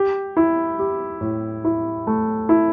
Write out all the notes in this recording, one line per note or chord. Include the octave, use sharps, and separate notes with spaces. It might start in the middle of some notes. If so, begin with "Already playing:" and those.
Already playing: G4
E4
G4
A2
E4
A3
E4